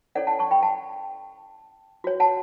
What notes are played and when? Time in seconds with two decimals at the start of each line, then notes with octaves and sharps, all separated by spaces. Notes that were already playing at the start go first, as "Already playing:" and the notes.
0.15 C#4 E4 A4 C#5 D5 F#5
0.27 F#5 A5
0.39 A5 C#6
0.51 G5 B5
0.63 F#5 A5
2.04 F#4 C#5
2.20 F#5 A5